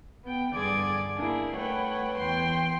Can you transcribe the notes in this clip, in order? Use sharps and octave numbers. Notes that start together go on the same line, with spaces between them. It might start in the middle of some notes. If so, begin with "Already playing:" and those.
B3 G5
G2 D3 G#4 D5 D6 G#6
A#3 D4 E4 G#4
A3 B4 C#5 F#5 G5
E2 G5 C6